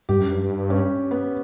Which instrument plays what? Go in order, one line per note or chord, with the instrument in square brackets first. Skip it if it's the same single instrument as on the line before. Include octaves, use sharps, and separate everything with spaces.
[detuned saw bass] G2 [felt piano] G4
[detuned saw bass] F#2
G2
[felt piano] C#4
B3